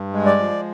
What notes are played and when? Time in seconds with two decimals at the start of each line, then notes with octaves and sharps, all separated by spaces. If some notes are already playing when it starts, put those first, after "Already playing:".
Already playing: G2
0.13 G#3
0.26 D5
0.38 F3